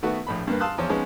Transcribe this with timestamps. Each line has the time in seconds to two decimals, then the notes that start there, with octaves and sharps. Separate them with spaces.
0.03 D#3 A3 B3 F#4
0.27 A#1 A2 B5
0.47 G2 A#3 B4
0.60 F5 A5 C6 D#6 E6 F#6
0.78 E2 F3 C#5
0.89 F3 G#3 B3 C#4 D#4